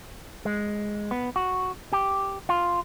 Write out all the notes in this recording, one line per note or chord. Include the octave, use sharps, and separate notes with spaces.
G#3
B3
F#4
G4
F4